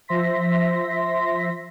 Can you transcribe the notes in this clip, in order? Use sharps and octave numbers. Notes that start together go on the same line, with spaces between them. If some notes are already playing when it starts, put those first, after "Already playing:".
F3 C5 E5 C6 A#6 B6